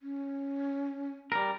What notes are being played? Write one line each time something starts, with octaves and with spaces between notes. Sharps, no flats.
C#4
G3 A#4